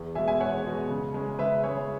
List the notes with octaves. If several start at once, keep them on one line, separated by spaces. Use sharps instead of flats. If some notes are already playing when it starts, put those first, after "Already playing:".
Already playing: E2
B2 G#3 E5 G#5
E5 G#5
E2 C#5 F#5
B2 G#3
C#3
G#3 C#4
C#3 B4 E5
G#3 C#4 G#4 C#5